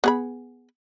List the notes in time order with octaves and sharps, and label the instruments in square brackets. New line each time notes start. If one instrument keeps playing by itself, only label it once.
[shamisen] B3 G#4 B5